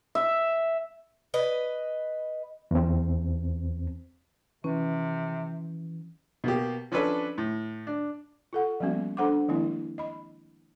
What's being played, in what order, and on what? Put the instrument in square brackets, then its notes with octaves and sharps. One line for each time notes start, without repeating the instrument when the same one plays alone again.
[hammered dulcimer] E5
[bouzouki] B4 D#5
[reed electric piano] E2 C4
[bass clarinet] C3 [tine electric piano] E3 [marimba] C#4
[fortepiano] B2 A#3 G4
F3 C#4 D4 A4 B4
A2
D4
[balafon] F4 A4 F#5
F3 G3 A#3 B3 C#4 F#4
D4 A4 C5 F#5 C6 D6
D#3 F3 G#3 A#3 C4 E4
D#5 B5